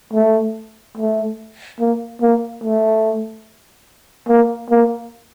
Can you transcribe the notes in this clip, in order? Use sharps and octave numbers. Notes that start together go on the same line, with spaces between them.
A3
A3
A#3
A#3
A3
A#3
A#3